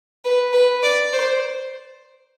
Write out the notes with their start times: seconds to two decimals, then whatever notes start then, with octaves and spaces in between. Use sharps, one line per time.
0.25 B4
0.53 B4
0.83 D5
1.13 C5